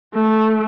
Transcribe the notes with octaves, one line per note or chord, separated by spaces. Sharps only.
A3